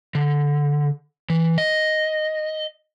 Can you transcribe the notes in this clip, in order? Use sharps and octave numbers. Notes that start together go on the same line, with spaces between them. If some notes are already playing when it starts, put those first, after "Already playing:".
D3
E3
D#5